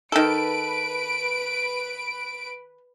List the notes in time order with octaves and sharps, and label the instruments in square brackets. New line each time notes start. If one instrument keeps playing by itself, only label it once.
[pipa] D#3 A4 [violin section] B4 D7